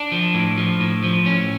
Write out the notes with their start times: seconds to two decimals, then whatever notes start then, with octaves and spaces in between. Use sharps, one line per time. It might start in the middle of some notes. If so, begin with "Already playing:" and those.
Already playing: D4
0.12 F3
0.34 A2
0.57 F3
0.80 A2
1.04 F3
1.25 A2 C#4